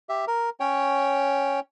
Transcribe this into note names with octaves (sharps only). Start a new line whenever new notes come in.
G4 E5
A#4
C#4 C#5 G5